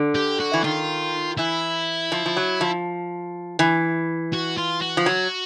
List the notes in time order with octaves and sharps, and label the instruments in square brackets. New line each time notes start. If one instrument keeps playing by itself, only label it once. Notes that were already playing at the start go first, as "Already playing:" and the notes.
Already playing: [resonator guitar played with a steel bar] D3
[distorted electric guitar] G4
F#4
[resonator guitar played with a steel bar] E3
[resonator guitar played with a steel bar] D#3 [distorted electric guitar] F4
[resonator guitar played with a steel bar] E3 [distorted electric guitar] E4
[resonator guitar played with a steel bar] F3
F3
F#3
F3
E3
[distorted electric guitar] F#4
F4
F#4
[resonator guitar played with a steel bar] F3
F#3